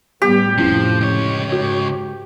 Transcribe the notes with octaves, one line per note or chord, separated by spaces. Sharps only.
A2 G3 B3 G4
F1 A2 F3 C#4 E4 C7
C#2 C#5
G#2 F#4